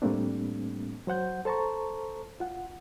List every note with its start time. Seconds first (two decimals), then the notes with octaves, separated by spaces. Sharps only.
0.02 A2 G3 A3 A#3 C4 D4
1.07 F#3 C5 F#5 G6
1.45 A4 C5 A5 A#5 C#6
2.40 F4 F#5